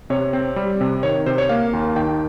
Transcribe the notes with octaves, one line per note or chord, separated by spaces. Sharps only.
C3 C#5
C4
G3
C3
D#3 C#5
C3 C5
C#5
A#3 F5
D#2
D#3 G5